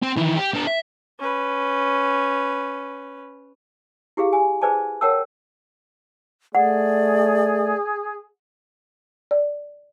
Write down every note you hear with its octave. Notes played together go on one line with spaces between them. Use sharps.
C4
D#3 E3
G4
B3 D4
E5
C#4 B4
E4 G4 G#4 F5
G#5
G#4 B4 C5 D5 G#5 A5
A#4 C#5 F#5 G5 A5 E6
A3 G#4 D5 F#5
D5